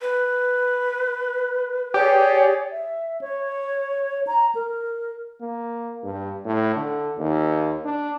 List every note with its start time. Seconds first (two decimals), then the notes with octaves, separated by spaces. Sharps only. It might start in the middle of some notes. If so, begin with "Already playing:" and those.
0.01 B4
1.94 G4 G#4 C#5 D5
2.72 E5
3.21 C#5
4.27 A#5
4.55 A#4
5.41 A#3
6.03 G2
6.45 A2
6.76 D3
7.18 D#2
7.85 D4